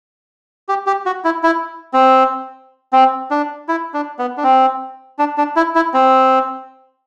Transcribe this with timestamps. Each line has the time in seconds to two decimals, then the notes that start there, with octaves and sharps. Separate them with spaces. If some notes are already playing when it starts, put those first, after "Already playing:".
0.69 G4
0.86 G4
1.06 F#4
1.24 E4
1.43 E4
1.93 C4
2.93 C4
3.31 D4
3.69 E4
3.94 D4
4.19 B3
4.37 D4
4.43 C4
5.19 D4
5.38 D4
5.56 E4
5.75 E4
5.94 C4